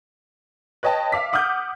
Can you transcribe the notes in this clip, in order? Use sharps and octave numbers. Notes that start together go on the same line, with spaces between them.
B4 C#5 D#5 G5 A5
E5 F5 D6 B6
F#5 D6 D#6 F6 G6